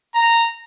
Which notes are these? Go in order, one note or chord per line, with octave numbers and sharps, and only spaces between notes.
A#5